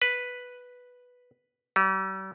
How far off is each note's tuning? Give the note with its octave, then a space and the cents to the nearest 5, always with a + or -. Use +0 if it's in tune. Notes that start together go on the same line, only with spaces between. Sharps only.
B4 +0
G3 -45